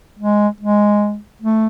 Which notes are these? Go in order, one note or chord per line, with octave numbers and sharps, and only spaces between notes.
G#3
G#3
A3